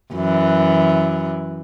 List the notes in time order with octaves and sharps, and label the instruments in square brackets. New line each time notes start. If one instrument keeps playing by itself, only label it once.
[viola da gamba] F#2 E3